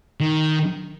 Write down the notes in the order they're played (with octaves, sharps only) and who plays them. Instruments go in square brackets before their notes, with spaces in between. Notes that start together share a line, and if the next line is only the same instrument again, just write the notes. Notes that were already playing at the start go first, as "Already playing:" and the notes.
[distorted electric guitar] D#3